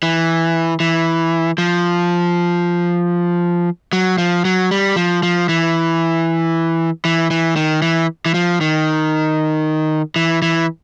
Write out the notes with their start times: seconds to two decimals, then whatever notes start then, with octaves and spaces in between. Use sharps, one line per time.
0.03 E3
0.80 E3
1.58 F3
3.93 F#3
4.18 F3
4.45 F#3
4.71 G3
4.96 F3
5.23 F3
5.49 E3
7.05 E3
7.31 E3
7.56 D#3
7.82 E3
8.26 E3
8.34 F3
8.61 D#3
10.16 E3
10.42 E3